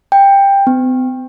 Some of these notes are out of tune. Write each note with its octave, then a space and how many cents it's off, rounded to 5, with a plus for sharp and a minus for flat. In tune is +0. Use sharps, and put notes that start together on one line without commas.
G5 +15
C4 -45